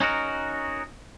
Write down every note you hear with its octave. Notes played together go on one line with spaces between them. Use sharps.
C#4 D#4 F#4 A#4